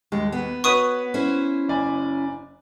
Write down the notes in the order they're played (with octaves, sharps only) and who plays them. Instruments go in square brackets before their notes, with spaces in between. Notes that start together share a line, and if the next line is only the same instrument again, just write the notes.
[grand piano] D#2 [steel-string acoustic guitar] G#3
[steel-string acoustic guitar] B3
[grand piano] F#4 B4 C#5 [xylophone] C#6 D#6 D#7
[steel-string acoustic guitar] C#4 E4 C5
[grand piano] F#1 D5 G#5